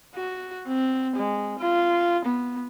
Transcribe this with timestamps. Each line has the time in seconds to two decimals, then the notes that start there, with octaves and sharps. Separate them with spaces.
0.15 F#4
0.67 C4
1.16 G#3
1.59 F4
2.25 B3